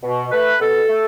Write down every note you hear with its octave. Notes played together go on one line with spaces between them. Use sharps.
B2
A3 B4
B2 A4
A3